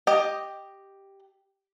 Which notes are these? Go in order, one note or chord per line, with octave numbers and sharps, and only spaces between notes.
G4 D#5